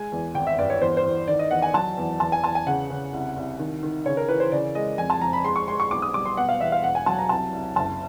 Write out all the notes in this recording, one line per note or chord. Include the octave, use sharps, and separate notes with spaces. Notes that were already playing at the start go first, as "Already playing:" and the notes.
Already playing: G#3 G#5
E2
G#1 G5
E5
G2 D5
C#5
E2 C5
C5
E2
D#3 D5
D#5
E2 F#5
G#5
F#3 A5
E2
E2 A5
G#5
E2 A5
G#5
C#3 F#5
C#3
C2
C2
D#3
D#3
C#3 C#5
A#4
E3 B4
C5
C#3 D5
G#3 D#5
F2 G#5
A5
F2 A#5
B5
G#3 C6
C#6
G#3 C6
C#6
B1 D6
D#6
G3 D6
C6
B2 F#5
F5
E2 E5
F5
E1 F#5
G#5
F#3 A5
A#5
C2 A5
C2
F#1 A5